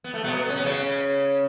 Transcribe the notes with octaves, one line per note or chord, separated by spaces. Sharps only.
B3
A3
B2 B3
C#4
B3
C#3 C#4